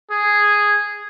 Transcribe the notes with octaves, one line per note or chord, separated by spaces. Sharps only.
G#4